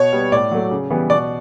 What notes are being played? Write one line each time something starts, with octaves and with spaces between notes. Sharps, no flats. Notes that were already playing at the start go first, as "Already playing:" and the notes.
Already playing: B2 C#5
G3 B3
A2 D5
F#3 A3
C#3
E3 G3 B3
B2 D5